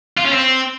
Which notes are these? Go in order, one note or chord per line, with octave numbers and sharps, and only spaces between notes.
F4
C#4
C4